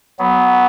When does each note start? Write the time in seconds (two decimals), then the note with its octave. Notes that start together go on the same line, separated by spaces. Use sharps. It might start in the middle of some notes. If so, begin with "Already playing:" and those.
0.19 F#3 B3